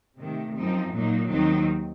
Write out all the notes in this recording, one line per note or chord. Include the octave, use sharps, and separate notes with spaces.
C3 D#3 A3
F#2 F3 C4 D#4
A#2 F#3 A#3 D#4
D#2 D#3 F#3 C4 D#4